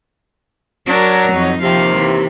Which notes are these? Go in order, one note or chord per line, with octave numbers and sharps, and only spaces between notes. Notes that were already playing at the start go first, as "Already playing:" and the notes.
F#3 D4 A#4
F2 D#4
D#2 C3 F3 F5
E3